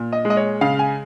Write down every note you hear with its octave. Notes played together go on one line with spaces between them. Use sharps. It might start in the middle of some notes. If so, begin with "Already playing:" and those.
Already playing: A#2
D#5
G#3
D#5
C#5
C#3 F5
G#5